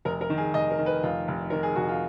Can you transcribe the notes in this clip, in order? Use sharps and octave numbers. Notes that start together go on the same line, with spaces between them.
F1 A#4
A#4
D#3
G#4
F1 D#5
A#4
D#3
B4
F1 F4
F1
D#3 A#4
G#4
F1 F#4
F4